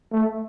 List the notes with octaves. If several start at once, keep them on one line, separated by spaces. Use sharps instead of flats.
A3